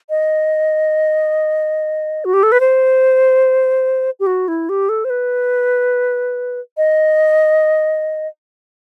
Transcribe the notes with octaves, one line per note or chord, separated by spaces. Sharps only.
D#5
F#4
G4
A4
B4
C5
G4
F#4
E4
G4
A4
C5
B4
D#5